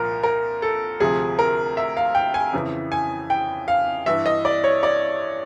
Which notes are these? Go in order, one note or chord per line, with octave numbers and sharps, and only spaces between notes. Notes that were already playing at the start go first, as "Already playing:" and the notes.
Already playing: C2 A#2 F3 A#4
A#4
A4
D2 C3 F3 G#4
A#4
E5
F5
G5
G#5
F2 C#3 E3
G#5
G5
F5
G2 E3 E5
D#5
D5
C#5
D5